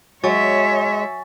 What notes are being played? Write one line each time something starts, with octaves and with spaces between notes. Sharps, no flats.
F#3 G#3 C#5 E5 G#5 C#6 A6